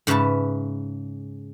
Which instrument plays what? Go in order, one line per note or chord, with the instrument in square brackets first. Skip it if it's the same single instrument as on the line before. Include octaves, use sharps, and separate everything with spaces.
[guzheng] G#2 C#3 B4 E5 A5